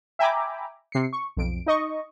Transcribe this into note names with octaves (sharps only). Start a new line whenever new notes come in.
E5 G5 G#5 A#5 B5 D6
C3 C7 C#7
C#6
B1 F2 D7
D#4 D#5 C#6